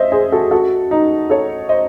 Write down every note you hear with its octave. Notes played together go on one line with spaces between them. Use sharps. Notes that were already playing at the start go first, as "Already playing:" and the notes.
Already playing: C5 D#5 E5
G#4 C5
F#4 A4
F#4 A4
D#4
A4 C#5
C5 D#5